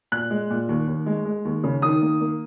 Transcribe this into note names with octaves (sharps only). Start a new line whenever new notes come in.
A#2 F#6
G#3
A#2
D#2
D#2
G#3
G#3
D#2
C#3
D#3 D#6
A#3
A#3